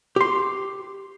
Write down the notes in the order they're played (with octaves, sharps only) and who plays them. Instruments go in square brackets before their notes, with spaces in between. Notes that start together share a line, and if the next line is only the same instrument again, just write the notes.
[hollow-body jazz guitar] G4 C6